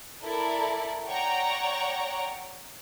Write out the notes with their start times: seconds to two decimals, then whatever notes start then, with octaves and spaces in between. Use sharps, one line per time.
0.22 E4 A4 A#4 D5
1.06 C#5 D5 F#5 G5 A#5 C#6